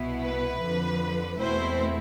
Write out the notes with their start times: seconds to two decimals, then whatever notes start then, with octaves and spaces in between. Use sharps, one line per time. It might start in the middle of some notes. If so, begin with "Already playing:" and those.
Already playing: C2 B2 B3 E4
0.24 B4
0.62 F2 D3 F3
1.40 E2 B2 A3 C4 E4 C5